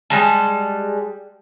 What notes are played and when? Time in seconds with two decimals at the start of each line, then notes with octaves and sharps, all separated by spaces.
0.10 G3 G#3 A5